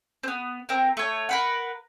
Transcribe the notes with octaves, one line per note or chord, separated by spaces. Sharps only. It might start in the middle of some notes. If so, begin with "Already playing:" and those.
B3 C4
C4 A#4
A3 C#5
A#4 B4 F#5